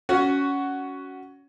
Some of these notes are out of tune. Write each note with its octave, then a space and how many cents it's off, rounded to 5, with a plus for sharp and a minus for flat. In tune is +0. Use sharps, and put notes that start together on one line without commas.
C#4 +15 F#4 +5